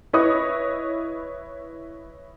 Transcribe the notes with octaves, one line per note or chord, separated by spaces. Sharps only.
E4 B4 C#5 D#5 D#6